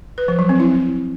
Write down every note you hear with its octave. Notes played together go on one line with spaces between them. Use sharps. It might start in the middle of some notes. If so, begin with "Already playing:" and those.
B4
F3
F#3
C4
E4